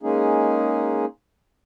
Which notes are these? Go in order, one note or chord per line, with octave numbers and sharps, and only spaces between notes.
G#3 A#3 C#4 D#4 G#4